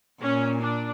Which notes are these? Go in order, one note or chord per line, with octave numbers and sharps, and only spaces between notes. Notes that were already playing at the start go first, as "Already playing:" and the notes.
A#2 C#4
D4